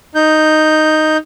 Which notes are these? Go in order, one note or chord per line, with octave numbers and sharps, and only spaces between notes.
D#4 G6